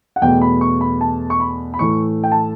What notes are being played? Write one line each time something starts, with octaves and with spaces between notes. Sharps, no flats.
F#5
E2 B2 A3 G5
B5
C#6
B5
A5
C#6
B5
B5
A2 E3 A3 C#6
G5
A5